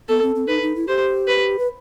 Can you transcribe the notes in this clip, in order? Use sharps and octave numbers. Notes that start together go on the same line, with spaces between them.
B3 A4
C4
C4
D#4 B4
D#4
E4
G4 C5
B4
B4